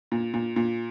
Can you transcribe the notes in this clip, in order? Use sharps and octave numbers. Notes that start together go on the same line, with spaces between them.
A#2
A#2
A#2